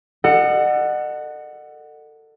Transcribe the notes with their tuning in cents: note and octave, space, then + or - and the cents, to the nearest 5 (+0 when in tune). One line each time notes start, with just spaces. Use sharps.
A4 +30 D#5 -40 F#5 +0